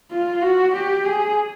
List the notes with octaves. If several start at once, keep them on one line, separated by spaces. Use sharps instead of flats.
F4
F#4
G4
G#4